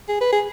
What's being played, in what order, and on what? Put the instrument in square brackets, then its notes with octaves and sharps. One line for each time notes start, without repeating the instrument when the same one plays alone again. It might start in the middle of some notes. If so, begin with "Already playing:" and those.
[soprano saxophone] G#4
B4
G#4